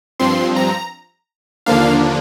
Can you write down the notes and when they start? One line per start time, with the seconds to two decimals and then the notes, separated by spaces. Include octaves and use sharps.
0.19 G2 F3 C4 C6
0.56 A#5
1.66 D#2 D3 F3 A#3 D4 F5